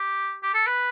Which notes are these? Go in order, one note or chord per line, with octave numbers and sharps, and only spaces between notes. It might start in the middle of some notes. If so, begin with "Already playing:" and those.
Already playing: G4
G4
A4
B4